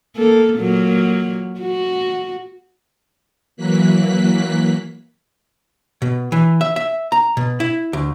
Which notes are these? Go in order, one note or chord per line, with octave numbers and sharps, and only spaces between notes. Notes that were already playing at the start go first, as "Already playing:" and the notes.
A#3 A4
A#2 F#3 A#3
F#4
E3 F#3 A#3 F#6 B6
B2
E3
E5
E5
A#5
B2
E4
D2